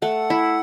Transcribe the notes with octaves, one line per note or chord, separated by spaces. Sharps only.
A3 F#5
E4